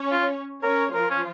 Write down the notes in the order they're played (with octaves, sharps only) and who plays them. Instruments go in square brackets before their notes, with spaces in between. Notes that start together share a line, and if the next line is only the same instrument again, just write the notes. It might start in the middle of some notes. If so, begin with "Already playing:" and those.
Already playing: [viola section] C#4 C#5
[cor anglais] F4
[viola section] C#4 C#5 [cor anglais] A#4
[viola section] F3 F4 [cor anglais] A#4
[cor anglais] C#4